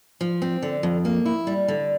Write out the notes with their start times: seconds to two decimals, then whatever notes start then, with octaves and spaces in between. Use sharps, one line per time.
0.21 F3
0.42 C4
0.62 D3
0.83 F2
1.05 A#3
1.26 E4
1.47 G3
1.68 D3